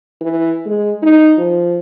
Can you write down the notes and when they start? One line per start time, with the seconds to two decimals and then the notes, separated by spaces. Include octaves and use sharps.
0.21 E3
0.66 G#3
1.03 D#4
1.38 F3